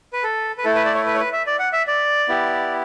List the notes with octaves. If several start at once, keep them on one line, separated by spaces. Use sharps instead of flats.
B4
A4
B4
A3 E4 A4
B4
D5
C#5
B4
C#5
B4
E5
D5
F#5
E5
D5
B3 E4 G4